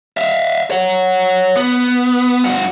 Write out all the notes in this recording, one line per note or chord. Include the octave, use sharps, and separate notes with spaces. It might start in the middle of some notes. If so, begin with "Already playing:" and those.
E5 F5
C#5 F#5
B3
G2 F#4